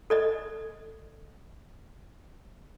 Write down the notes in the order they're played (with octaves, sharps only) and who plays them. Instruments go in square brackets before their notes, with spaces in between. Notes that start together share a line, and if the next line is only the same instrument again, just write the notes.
[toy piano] A4 D5 D#5